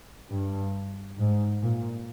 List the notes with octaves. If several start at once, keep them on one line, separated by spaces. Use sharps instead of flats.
G2
G#2
A#2